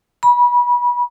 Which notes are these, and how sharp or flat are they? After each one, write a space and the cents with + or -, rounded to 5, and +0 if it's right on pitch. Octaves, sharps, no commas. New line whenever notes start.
B5 -30